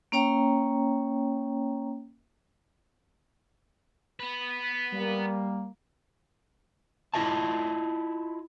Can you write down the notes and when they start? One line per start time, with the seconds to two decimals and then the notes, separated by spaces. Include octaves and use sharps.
0.12 A#3 C#4 C#5 G5 A#5
4.20 B3 B4
4.92 G3 A#3
7.14 E4 F4 D#5 E5 A5